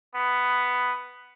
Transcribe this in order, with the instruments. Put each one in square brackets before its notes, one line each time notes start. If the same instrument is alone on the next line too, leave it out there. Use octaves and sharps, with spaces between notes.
[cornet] B3